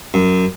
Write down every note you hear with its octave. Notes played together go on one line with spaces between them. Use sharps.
F#2